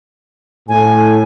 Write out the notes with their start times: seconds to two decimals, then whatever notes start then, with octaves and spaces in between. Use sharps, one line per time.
0.69 A2 G#5